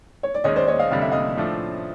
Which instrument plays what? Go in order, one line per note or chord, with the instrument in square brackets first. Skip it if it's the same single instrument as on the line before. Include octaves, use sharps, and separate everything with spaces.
[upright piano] C#5
D5
[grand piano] D#2 D#3 G#3 C#4 [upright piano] C#5 D#5
[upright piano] C5 D5
C#5 D#5
D#5 F5
[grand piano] F1 F2 D3 G3 [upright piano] F5
[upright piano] E5
D#5 F5
[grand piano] A2 F3 A3 D4